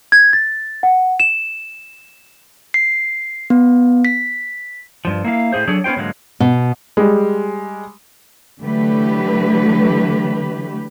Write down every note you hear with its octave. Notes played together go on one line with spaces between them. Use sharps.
G#6
A6
F#5
E7
C7
B3
B6
G2 F3
A#3 E4 F5
A2 G#4 C5
F#3 D4 G#4 A4 C#5
B3 C#4 F4 C5 G5
G#2 D3 F#3 G#3 A#3
B2
G3 G#3
D3 E3 F#3 A3 G4 B4